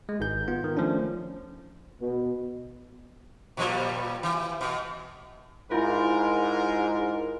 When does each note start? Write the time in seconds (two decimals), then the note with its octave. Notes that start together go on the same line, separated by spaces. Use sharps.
0.09 G#3
0.20 G#1 G#2 G6
0.48 B3 F4
0.64 D#3
0.77 F3 A3 C#4 D4
2.00 B2
3.57 A#2 F3 G3
4.23 E3
4.61 B2
5.72 G#2 E4 F4 A#4